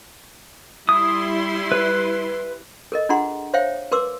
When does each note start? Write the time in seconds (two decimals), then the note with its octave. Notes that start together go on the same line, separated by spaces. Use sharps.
0.89 G3 E4 C6 D#6
1.72 B4
2.92 A4 A#4 D#5
3.09 D4 F4 G#4 F#5 A#5 C6
3.54 C5 C#5 E5 F5 G5
3.91 A#4 B4 C6 D6 E6